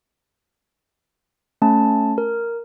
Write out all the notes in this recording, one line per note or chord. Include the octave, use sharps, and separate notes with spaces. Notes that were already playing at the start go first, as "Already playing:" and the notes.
A3 C#4 A5
A#4